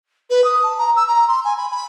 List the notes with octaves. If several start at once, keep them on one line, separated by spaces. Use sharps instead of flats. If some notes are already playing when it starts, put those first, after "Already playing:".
B4
D#6
A5
A#5
E6
A#5
C6
G#5
B5
B5